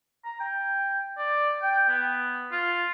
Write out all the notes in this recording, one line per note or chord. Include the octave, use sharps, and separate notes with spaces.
A#5
G5
D5
G5
B3
F4